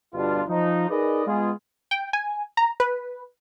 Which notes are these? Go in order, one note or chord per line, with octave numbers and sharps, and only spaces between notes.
G1 B2 G3 D4 F4
F3 D#4
D#4 G#4 A#4 B4 D5 D#5
G#3 B3 F4 G#4
G5
G#5
A#5
B4